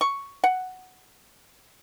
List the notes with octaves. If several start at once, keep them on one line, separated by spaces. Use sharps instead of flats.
C#6
F#5